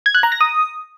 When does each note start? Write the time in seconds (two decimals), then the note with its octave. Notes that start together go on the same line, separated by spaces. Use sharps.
0.06 G#6
0.15 F#6
0.23 A#5
0.32 A#6
0.41 D#6